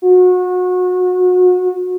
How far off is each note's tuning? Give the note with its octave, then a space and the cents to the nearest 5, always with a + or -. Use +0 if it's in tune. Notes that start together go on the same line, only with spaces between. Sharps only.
F#4 -30